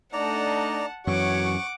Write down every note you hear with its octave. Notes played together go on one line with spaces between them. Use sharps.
A3 D4 D#4 D5 F#5 A5 A#5
F#2 E3 F#4 C#5 F#5 C#6 D6